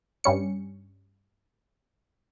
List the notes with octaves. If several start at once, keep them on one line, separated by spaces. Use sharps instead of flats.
G2 G3 C#4 C#7